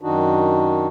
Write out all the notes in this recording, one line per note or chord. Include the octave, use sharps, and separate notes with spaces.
F#2 D#3 D4 D#4 F#4